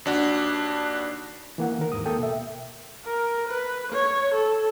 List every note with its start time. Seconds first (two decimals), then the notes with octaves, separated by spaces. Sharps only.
0.06 D#2 D4 F#4
1.58 E3 A#3 F#5
1.78 D#3 A#4
1.92 D#2 G#2 D#6
2.06 A#3 A4 G5
2.18 B2 E5
3.05 A#4
3.48 B4
3.92 C#5
4.35 A4